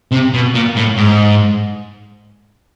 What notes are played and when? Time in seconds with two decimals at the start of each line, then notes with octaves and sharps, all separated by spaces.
0.12 C3
0.34 B2
0.55 A#2
0.76 A2
0.97 G#2